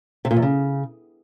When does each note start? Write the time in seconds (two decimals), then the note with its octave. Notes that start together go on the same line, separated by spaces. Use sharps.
0.25 C3
0.31 A#2
0.37 E2
0.42 C#3